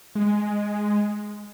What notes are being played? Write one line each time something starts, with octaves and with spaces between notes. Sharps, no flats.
G#3